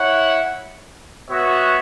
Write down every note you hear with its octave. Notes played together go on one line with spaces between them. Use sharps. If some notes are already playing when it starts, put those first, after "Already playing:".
Already playing: E4 C#5 F#5
B3 F#4 C#5 E5